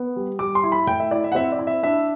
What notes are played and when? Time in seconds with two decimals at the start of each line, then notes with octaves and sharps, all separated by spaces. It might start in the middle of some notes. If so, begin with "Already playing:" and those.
Already playing: B3
0.16 G3
0.39 G3 D6
0.55 C6
0.63 E4
0.72 B5
0.87 A2 G5
1.00 E5
1.11 E4 D5
1.24 E5
1.32 F#5
1.35 C4 E5
1.52 D5
1.59 E4
1.67 E5
1.83 D4 E5